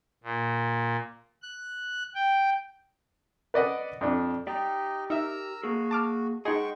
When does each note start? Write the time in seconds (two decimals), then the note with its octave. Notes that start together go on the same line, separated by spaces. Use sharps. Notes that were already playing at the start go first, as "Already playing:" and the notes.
0.23 A#2
1.42 F#6
2.15 G5
3.54 B4 D5 D#5 F#5
4.01 F2 D4
4.47 D#4 G4 D5 D#5 G5
5.10 D#4 A#4 E5 A#5 E6
5.63 A#3 F#4 G#4
5.91 A5 D6 F6
6.45 G#3 D#4 G#4 D#5 F#5 G5 C#6